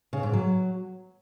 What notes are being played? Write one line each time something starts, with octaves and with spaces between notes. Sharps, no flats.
C#3
G#2
F#3